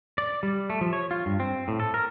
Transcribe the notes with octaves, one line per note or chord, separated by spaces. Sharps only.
D5
G3
A3
F3
C#5
F4
G2
C4
A2
A4
A#4